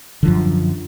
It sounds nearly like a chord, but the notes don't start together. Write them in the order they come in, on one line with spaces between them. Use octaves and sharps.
D3 F3 F#2